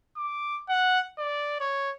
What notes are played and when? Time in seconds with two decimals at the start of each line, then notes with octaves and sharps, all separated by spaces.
0.17 D6
0.69 F#5
1.18 D5
1.60 C#5